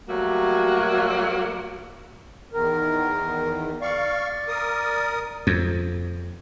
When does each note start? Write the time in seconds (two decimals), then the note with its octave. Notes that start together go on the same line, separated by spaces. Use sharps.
0.09 F#3 G3 A3 A#3 F#4
2.54 E2 D#3 A#4
3.82 D5 F5 C#6
4.48 A#4 D#6
5.47 F2